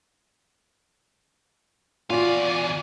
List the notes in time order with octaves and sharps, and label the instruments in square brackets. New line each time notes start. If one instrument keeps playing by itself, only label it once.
[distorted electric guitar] E2 F5 [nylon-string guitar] F4 F#4 [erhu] D5 [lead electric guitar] G#5